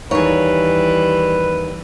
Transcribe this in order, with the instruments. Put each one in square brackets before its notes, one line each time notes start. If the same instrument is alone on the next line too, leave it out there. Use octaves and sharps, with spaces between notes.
[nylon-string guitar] D#2 [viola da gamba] E3 G3 [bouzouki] G#4 C#5 [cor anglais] B4